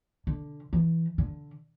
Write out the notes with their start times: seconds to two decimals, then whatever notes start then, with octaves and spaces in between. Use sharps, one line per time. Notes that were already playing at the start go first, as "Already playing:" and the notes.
0.27 D3
0.73 E3
1.18 D3